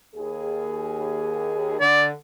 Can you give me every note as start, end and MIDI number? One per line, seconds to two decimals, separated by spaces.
0.15 1.78 39
0.15 1.78 68
1.80 2.11 50
1.80 2.06 74